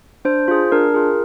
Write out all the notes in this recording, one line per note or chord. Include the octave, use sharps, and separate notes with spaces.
D4 C5
F4 G#4
D4 A#4
F4 G#4